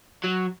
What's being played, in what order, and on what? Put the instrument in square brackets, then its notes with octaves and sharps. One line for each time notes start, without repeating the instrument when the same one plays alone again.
[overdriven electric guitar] F#3